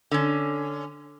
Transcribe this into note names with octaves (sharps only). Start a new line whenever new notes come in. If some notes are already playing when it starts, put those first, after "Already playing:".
D3 C#4